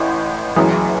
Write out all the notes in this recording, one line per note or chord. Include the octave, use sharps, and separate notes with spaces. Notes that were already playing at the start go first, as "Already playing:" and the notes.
Already playing: A1 A2 E3
F#1 F#2 E3